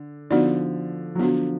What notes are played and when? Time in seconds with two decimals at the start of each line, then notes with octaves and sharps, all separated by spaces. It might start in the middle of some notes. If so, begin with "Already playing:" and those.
Already playing: D3
0.30 D3 F3 B3 D#4 F#4 D5
1.15 F#3
1.19 D3 F3 B3 D4 F#4